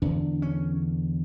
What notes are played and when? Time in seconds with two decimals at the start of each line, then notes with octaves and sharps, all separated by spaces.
0.02 E2 D3 D4
0.42 C#4